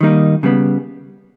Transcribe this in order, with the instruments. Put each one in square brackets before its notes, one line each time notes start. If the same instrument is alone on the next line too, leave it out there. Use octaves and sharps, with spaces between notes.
[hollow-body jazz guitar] D#3 G3 A#3 D#4
C#3 G3 B3